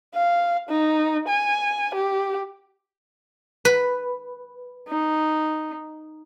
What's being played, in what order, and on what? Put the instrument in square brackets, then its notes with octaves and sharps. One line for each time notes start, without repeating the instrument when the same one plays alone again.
[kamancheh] F5
D#4
G#5
G4
[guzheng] B4
[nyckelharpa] D#4